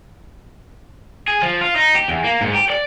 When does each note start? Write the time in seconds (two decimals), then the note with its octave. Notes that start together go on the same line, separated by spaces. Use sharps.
1.28 G#4
1.43 F3
1.61 F4
1.76 D#4
1.95 G4
2.08 E2
2.24 A#3
2.41 G#2
2.54 G4
2.70 D5